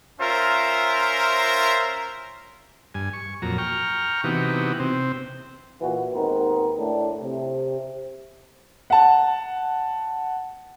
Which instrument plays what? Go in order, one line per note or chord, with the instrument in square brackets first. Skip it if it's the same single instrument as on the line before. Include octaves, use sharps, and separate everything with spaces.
[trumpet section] C#4 F4 A#4 C5 E5
[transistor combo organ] G2 G#5
C#6
F2 A#2 F#3 A#5
G5 A#5 C#6 F6
C3 E3 B3 D#4 F#4 G4
C3 C4
[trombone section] A#2 E3 F#4
D#2 G#2 D#3 B3 C4 A#4
A2 D4
C3
[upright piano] F#5 A5